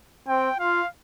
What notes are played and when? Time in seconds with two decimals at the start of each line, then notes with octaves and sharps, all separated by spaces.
0.28 C4 G5
0.59 F4 F5